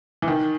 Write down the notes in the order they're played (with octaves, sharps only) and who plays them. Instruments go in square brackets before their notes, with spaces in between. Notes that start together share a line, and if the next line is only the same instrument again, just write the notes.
[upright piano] E3
D#3